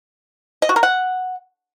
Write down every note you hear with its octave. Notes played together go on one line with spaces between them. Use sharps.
D#5
F#4
A#4
F#5